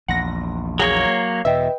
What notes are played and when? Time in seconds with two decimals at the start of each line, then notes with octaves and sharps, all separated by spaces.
0.08 A#1 E2 F#5 A#6
0.79 F#3 A#3 G#4 C#5
1.45 E2 B2 B4 D#5 E5 G5